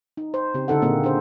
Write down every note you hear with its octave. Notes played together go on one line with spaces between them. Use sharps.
D#4
C5
C#3 C4 G4
D3 D#4 A4 F#5
A#2 A#3 C4 G#4 A4
D4 G#4 C5